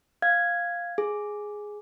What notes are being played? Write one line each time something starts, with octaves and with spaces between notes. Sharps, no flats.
F5 G#6
G#4